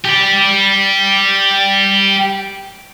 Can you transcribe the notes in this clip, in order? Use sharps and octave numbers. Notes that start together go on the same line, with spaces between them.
G4 D5